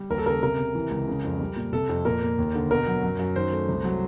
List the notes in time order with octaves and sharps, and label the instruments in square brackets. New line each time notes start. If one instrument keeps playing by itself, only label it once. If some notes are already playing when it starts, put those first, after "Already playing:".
Already playing: [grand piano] G3
D#2 A#4
A4
C#3 A#4
C3 A#4
C3
E3
C#2
C#3
F2
G3
A#2
C3 A4
F2
A#2 A#4
A#3
D#2
D3
B2 A#4
F#3
F#2
F#2
D#3 C5
A3
C2
F#3